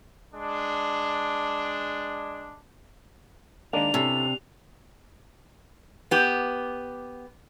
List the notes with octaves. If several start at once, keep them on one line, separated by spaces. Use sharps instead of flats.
G#3 D4
D#3 G#3 A#3 D4 F7
C3 C#4 E4 A4
B3 G4